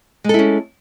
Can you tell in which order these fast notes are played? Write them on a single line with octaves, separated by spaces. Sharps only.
G#3 A4 E4 C#4